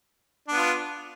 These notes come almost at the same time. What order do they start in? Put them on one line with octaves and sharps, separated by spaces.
D4 B3 F4